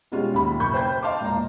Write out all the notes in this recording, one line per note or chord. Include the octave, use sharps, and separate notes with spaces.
B2 G3 G#3 C#4 F4
D#2 B5
F#1 B5 C#6 G6
C5 G5 B5 G6
D#5 F5 A5 C6 D6
E1 A#2 A#5